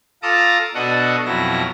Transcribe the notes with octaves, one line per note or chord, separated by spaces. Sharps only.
F4 A4 A5 A#5 D6 D#6
B2 D4 F#4 A4 D#5 F#5
F2 B2 F#3 E4 A#6